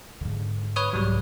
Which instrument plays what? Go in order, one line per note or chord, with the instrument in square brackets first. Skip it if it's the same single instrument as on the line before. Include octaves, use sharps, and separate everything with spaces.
[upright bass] G#2 D3
[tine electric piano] B4 C#5 D#6
[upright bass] C2 G#2 [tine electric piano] F#3 G3